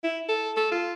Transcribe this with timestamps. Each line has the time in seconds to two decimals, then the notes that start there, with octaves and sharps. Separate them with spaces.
0.04 E4
0.29 A4
0.57 A4
0.72 F4